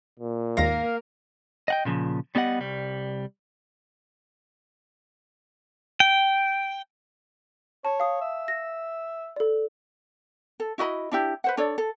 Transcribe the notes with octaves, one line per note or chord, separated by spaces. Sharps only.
A#2
D#2 G#2 A#3 A#4 F5 A#6
D#5 F#5 G5
A#2 C#3 F3
G3 B3 G4 D#5 F#5
C2 G3
G5
C#5 A5
F5 D#6
E5
A#6
A4 D5
A4
E4 F#4 D#5 B5
D4 E4 G4
B4 C5 F#5
D4 A4 C#5 D5
A4